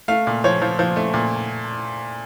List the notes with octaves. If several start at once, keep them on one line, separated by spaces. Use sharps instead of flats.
A3 F5
A#2
F3 C#5
F3
F3
A3
A#2